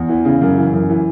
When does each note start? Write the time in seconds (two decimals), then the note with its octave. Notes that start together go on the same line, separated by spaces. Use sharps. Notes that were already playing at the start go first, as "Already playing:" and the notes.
Already playing: E2
0.09 E3
0.25 C#3
0.41 F#2
0.58 E3
0.73 F#2
0.89 E3